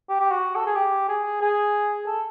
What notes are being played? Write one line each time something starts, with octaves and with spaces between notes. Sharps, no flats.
G4
G4
F#4
A4
G#4
G4
G#4
G#4
A4